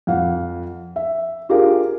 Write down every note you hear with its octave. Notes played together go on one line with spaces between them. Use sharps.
F2 F5 F#5
E5
D4 F4 G4 G#4 A#4 F5